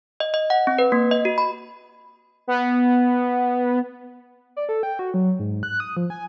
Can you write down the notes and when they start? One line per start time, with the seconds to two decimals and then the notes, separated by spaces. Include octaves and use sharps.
0.20 D#5
0.34 D#5
0.50 F#5
0.67 C4
0.78 B4
0.92 A#3
1.11 D#5
1.25 F#4
1.38 B5
2.48 B3
4.56 D5
4.69 A4
4.83 G5
4.99 F#4
5.14 F#3
5.39 G#2
5.63 F#6
5.80 D#6
5.97 F3
6.10 G#5